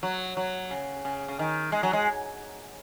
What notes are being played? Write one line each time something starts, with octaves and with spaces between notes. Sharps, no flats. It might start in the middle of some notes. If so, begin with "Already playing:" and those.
F#3
F#3
C#3
C#3
C#3
D#3
G#3
F#3
G#3